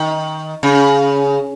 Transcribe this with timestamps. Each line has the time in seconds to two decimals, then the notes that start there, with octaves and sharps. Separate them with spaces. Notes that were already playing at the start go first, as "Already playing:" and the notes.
Already playing: D#3
0.63 C#3